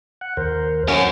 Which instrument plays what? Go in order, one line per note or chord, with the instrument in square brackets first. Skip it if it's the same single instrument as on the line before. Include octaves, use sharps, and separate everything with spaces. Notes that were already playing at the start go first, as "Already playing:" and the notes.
[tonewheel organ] F#5
D#2 A#4 C5
[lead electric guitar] C#4 F#4